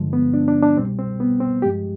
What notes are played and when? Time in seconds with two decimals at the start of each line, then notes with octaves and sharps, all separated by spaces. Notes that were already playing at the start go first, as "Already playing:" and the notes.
Already playing: G2 D3 F3 G#3
0.13 B3
0.34 D4
0.48 D4
0.62 D4
0.77 C2 B2 G3 C4
0.99 C4
1.20 B3
1.40 C4
1.62 G2 F3 G#3 G4